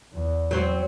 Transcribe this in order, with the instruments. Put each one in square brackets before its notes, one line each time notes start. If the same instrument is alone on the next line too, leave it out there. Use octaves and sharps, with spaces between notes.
[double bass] E2
[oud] F#3 C4